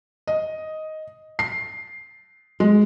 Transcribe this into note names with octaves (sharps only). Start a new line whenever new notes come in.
D#5
C7
G#3